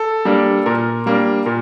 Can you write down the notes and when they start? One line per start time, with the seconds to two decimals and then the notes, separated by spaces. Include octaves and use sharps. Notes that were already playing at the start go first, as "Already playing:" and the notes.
Already playing: A4
0.25 G3 A#3 D4
0.66 A#2 A#4
1.06 G3 A#3 D4
1.46 A#2 A#4